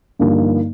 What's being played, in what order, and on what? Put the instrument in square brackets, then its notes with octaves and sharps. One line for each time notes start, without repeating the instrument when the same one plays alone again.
[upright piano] G2 D3 F3 A#3 D#4